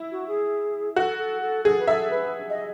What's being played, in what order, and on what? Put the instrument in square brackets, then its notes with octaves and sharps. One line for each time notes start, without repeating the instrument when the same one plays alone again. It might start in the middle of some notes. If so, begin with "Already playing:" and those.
Already playing: [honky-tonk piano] E4
[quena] F#4
G#4
[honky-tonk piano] F#4 [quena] A4
[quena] A4
A4
[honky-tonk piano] G#4 [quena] A4
[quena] B4
[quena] A4 [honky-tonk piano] E5
[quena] B4
D#5